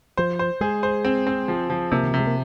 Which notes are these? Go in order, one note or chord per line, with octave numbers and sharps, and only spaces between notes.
F3 C5
C5
G#3 G#4
C5
C4
C4
F3
F3
C3 A#3
D#3
C3 F3
G#3
A#3